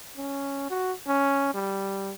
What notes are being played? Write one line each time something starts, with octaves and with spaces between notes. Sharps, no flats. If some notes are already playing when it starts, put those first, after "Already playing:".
C#4
F#4
C#4
G3